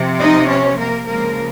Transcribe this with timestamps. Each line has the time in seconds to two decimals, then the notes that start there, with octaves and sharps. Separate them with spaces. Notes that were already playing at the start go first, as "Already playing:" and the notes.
Already playing: C3 F3 C4
0.19 D#4 D#5
0.49 C#4 C#5
0.78 A#3 A#4
1.08 C#3 F3 G#3 A#3 A#4